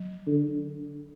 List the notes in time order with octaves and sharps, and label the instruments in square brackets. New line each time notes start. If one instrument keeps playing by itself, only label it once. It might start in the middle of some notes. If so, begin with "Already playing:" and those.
Already playing: [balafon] F#3
[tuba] D3